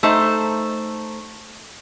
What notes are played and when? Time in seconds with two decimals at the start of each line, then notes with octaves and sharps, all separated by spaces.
0.03 A3 D#4 C5